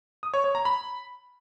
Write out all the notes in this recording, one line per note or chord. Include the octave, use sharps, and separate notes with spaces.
D#6
C#5
C#5
A#5
B5